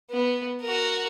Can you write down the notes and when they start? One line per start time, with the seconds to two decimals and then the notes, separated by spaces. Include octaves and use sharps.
0.10 B3
0.62 F#4 A#4